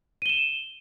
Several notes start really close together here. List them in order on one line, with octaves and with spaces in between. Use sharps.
D#7 G7 E7